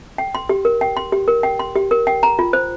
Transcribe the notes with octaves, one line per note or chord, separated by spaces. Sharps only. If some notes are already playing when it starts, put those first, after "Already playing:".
G5
C6
G4
A#4
G5
C6
G4
A#4
G5
C6
G4
A#4
G5
A#5
F4
C5